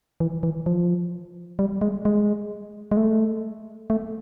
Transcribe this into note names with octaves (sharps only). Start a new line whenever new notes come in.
E3
E3
F3
G3
G#3
G#3
G#3
A3
A3